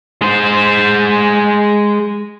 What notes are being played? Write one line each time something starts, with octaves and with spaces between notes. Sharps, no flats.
G#3 C5